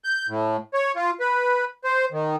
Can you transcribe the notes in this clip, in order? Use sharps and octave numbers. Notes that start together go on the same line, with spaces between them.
G6
A2
C#5
F4
B4
C5
D#3